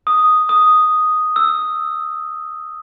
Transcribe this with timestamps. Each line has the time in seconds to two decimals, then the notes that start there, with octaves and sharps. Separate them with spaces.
0.07 D#6
0.49 D#6
1.36 E6